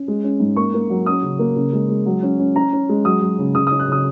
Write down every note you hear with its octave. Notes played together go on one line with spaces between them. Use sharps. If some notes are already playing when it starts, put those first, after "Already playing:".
Already playing: C#4
G#3
C#4
G#2
A#3 C#6
A#3
F#3
C#4 D#6
C#3
A#3
C#3
G#3
G#3
F#3
C#4
C#4
C#4 A#5
C#4
G#3
F#3 D#6
F#3
C#3
C#3 D#6
C#4 D#6
F#6
C#3 D#6